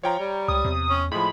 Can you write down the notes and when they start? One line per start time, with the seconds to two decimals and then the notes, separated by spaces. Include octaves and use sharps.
0.03 F3 C#5 G5 A#5
0.19 G3
0.48 C#2 D#6
0.64 E2 C3
0.90 C#4
1.12 A2 F3 G#3 B5